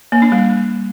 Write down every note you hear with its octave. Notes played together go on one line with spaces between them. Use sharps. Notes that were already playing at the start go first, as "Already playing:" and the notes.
A#3
D4
G3